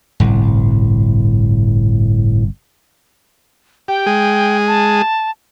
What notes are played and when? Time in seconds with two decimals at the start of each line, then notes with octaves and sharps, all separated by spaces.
0.20 G1 C2 A2
3.88 G4 G5
4.06 G#3 G#4
4.67 A5